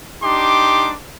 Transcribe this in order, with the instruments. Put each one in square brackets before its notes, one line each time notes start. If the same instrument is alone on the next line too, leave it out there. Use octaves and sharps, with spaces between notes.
[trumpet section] D4 D#4 G4 C6 D6